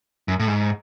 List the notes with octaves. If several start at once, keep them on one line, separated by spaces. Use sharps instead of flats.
F#2
A2
G#2